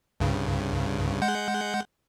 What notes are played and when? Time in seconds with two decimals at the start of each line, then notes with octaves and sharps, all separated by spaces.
0.20 C2 G2 C#3
1.22 G#3 F#5 G6